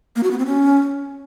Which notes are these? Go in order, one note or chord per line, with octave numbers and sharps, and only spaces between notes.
A#3
F#4
B3
C4
C#4